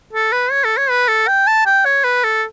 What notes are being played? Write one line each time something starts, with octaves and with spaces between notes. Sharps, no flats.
A4
B4
C#5
A4
C#5
B4
A4
G5
A5
G5
C#5
B4
A4